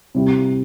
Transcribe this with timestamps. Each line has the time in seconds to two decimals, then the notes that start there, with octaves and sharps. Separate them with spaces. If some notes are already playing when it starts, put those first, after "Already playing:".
0.15 C3 G3 E4 G4